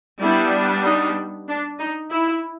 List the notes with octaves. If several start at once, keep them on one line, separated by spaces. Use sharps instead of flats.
G3 B3 D4 E4
D#4
D4
D#4
E4